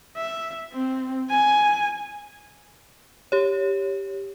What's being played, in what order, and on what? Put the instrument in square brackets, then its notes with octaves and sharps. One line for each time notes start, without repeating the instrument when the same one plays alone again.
[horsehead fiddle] E5
C4
G#5
[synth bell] G4 C#5